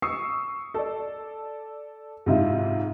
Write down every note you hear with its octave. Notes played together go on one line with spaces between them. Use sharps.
C#6 D#6 E6 C7
A4 D5
G#2 C3 E4 F4